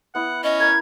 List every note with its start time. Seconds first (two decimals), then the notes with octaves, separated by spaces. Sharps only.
0.15 B3 E4 F#5 E6
0.44 C#4 D#5
0.60 A#4 G#6